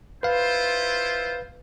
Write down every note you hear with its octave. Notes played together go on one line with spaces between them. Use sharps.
E4 F4 B4 C5 F5